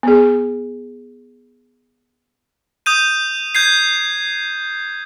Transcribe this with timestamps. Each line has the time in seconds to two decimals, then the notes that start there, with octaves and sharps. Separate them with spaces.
0.03 B3 G#4
2.86 D#6 G6 D#7
3.55 G6 G#6 C7